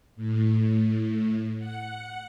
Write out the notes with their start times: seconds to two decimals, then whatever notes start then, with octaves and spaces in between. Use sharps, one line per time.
0.16 A2
1.59 F#5